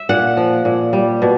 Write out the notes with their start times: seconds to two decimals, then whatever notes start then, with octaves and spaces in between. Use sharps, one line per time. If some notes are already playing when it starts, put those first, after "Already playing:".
Already playing: E5
0.09 A#2 F#5
0.37 F3
0.65 A#2
0.93 G3
1.22 B2